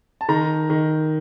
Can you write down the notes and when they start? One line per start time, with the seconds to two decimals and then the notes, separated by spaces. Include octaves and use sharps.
0.21 A5
0.29 D#3 A#5
0.70 D#3